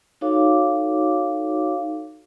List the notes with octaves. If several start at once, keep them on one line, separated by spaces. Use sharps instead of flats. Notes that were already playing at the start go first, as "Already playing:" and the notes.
D#4 F#4 A4 C#5 F5 D6